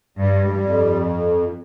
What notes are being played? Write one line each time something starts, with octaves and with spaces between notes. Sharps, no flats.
G2 G3
G2
F2